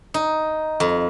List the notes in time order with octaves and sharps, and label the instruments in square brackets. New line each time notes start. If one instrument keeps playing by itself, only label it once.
[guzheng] D#4
F2